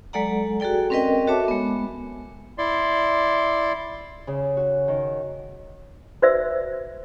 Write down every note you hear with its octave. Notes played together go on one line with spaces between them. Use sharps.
F#3 G#3 A4 D5 F#5 A#5
F#4 G#4 A4 D5 G5
C4 C#4 A#4 B4 D#5 G5
F#4 A4 C#5 E5 A5 D6
G#3 B3
E4 D5 C6
C#3
F#4
D#3
F#4 B4 C5 D5 E5 E6